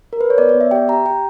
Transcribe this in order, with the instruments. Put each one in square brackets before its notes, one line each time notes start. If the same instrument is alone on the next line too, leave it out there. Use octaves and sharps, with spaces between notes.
[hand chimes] A#4
B4
C#5
B3 D5
D5
B3
E5
G4 G5
G4 A#5
G4 G5